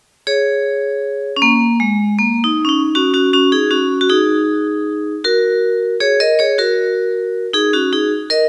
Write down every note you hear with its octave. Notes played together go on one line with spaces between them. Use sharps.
G#4 C#5
C#4
A#3
G#3
A#3
D#4
C#4
D#4
C#4 F#4
C#4 F#4
C#4 F#4
D#4 G#4
C#4 F#4
F#4
D#4 G#4
F#4 A#4
G#4 C#5
A#4 D#5
G#4 C#5
F#4 A#4
D#4 G#4
C#4 F#4
D#4 G#4
A#4 D#5